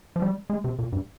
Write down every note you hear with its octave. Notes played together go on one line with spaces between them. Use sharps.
F3
G3
G#3
C3
A#2
G2